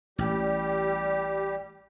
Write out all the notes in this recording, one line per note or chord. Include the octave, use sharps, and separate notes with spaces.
A1 G3 G4